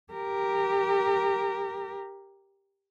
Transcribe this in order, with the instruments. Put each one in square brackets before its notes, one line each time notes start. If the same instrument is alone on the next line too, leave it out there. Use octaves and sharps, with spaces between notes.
[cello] G4 A#4